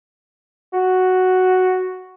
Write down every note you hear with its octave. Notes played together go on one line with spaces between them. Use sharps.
F#4